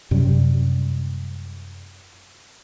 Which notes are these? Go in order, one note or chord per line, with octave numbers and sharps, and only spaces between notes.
F#2 C3 F#3 G3